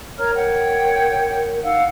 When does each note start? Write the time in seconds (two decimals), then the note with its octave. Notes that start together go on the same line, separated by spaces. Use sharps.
0.18 A#4 C#5 A#5 F6
0.34 C#5 F#5 G5
1.63 D#4 F5 F#5 E6